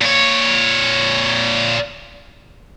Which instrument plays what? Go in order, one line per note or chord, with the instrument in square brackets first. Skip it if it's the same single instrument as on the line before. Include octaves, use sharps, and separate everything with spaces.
[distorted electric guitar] A#2 C#5